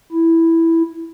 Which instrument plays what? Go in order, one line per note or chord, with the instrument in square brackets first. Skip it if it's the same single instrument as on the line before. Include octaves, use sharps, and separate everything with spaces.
[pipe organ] E4